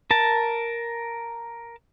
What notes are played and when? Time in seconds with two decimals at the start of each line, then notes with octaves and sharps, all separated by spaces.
0.11 A#4 A5